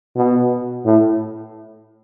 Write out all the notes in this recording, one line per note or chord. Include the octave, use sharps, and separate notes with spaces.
B2
A2